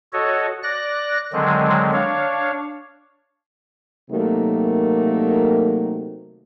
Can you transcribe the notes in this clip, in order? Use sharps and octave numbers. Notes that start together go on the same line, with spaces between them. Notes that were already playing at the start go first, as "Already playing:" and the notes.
F#4 A4 C#5 D#5
D5 F#6 A#6
D3 D#3 F#3 G#3 C4
D4 C#5 F5
C3 D#3 F#3 A3 A#3